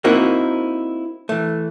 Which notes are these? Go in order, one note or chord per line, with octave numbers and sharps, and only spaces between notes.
A#3 C4 D#4 E4 F#4 A#4
E3 A3